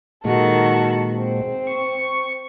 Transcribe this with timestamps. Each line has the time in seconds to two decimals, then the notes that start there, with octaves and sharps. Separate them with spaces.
0.25 A#2 D#3 G#3 F#4 A4
1.16 C4
1.67 C#6